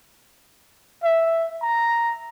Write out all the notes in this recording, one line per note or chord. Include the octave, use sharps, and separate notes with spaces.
E5
A#5